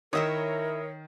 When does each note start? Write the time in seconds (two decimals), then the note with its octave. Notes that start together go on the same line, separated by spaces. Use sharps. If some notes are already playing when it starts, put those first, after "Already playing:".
0.13 D#3 E4 A#4 C#5 D#5 E5 D#6